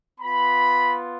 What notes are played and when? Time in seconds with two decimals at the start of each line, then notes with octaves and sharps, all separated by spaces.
0.20 B3 F4 B5